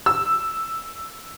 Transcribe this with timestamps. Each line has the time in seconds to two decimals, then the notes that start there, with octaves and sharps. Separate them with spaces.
0.06 E6